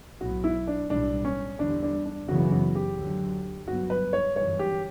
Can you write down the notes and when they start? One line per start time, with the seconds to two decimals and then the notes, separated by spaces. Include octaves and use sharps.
0.21 B1 A2 F#3 B3 F#4
0.44 E4
0.67 D4
0.90 B1 A2 E3 G3 D4
1.25 C#4
1.59 E2 D3 G3 D4
1.83 D4
2.05 D4
2.28 F#1 F#2 C#3 E3 B3 F#4
2.52 F#4
2.75 G4
2.98 D2 D3 F#3
3.67 G1 G2 F#3 B3 F#4
3.90 B4
4.13 C#5
4.36 G1 F#2 E3 G3 C#5
4.59 G4